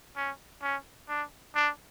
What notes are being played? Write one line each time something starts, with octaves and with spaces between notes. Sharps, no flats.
C#4
C#4
D4
D4